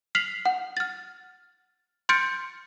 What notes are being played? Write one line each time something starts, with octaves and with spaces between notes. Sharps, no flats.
F6 B6 C7 F7 F#7
F#5
F6 A6
C6 F6 G6 A6 C#7 D7